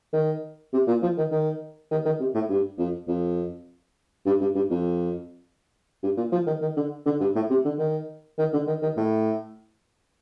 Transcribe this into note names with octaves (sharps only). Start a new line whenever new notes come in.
D#3
C3
A#2
F3
D#3
D#3
D#3
D#3
C3
A2
G2
F2
F2
G2
G2
G2
F2
G2
A#2
F3
D#3
D#3
D3
D3
G2
A2
C3
D3
D#3
D#3
D3
D#3
D#3
A2